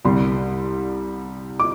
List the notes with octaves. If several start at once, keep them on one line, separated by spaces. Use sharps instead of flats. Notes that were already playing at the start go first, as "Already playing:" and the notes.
C2 C3 G3 C6
D6